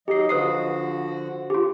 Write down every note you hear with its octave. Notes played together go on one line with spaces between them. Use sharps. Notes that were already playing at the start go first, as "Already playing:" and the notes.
F#3 D#4 G4 D#5 C7
D3 F3 F#4 B4 D#6 C7
F4 G4